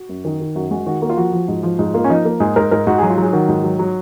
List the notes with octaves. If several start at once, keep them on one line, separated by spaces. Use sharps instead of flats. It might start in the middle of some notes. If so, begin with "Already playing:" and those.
Already playing: F#4
F#2
D#3
D#3
F#2 F#4
G#3 F#4
D#3 F#4
A#3 F#4
F4
F3 F#4
F3
G#2
F3
G#2
A#3 F4
C#4
F3 D#4
A#3
G#2 G#4
G#2 A#4
G#2 A#4
G#2 F#4
F#3 G#4
F4
F#3 G#4
D#3 F#4
G#2
F#3
F#3